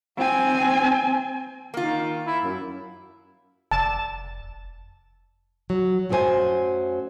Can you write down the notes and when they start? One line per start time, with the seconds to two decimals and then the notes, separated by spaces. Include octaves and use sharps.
0.17 C4 G#5
1.74 D#3 A#3 F4
2.27 E4
2.44 F#2
3.71 F1 A5
5.70 F#3
6.09 F#2 F#3 A3 G#4 C5 G#5